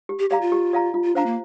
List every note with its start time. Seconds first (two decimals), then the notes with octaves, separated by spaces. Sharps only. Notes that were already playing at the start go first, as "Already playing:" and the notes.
0.09 G4
0.19 G4
0.30 G4 D5 F5 A#5
0.41 F4
0.52 G4
0.73 D5 F5 A#5
0.94 F4
1.04 F4
1.15 D4 C5 F5 A#5
1.26 A#3